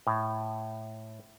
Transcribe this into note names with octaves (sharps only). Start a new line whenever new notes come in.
A2